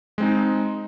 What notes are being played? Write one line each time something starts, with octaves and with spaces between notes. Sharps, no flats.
G#3 C4 D#4